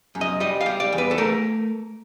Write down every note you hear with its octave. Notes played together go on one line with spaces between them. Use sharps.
F#2
D#5
G3 D#5
F5
G3
D5
E2
B4
A4
A3 A#4